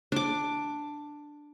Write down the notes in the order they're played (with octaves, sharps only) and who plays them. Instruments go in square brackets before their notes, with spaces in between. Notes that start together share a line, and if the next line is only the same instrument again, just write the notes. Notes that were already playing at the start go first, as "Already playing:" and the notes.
[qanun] D4 D6